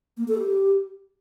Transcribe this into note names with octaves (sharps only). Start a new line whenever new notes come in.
A#3
A4
G4